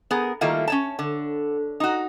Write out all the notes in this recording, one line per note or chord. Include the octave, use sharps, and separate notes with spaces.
B3 G#4 A#4
D#3 G3 A3 A#3 E4 F4
C#4 C#5 A5
D3
D#4 F#4